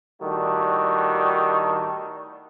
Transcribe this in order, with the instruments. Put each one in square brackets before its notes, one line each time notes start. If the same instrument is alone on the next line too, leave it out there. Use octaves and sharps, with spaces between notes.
[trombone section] A2 D#3 G3 A3 D4 F#4